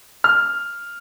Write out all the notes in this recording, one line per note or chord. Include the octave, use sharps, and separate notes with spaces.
F6